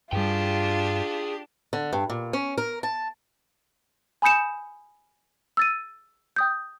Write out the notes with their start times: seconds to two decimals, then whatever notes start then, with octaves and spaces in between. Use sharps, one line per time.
0.13 G2 G3 D4 F4 G4 G#4 G5
1.73 D3
1.93 G2
2.10 A#2
2.33 C#4
2.58 A#4
2.83 A5
4.22 G#5 B5 D#6 G6 C#7 E7
5.57 E6 A6 D#7
6.36 G5 D#6 G6